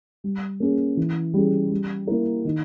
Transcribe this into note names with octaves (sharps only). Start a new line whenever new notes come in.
G3
A#3 C#4 G#4
E3
G3 C#4 G#4
G3
A#3 E4 A#4
D#3